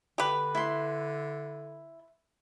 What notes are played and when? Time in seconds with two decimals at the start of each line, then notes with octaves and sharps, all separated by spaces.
0.18 D3 G4 B4
0.55 E4 C6